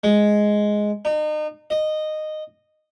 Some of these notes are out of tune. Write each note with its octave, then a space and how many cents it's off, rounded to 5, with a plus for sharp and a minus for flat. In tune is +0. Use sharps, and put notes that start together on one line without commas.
G#3 +5
D#4 -35
D#5 -10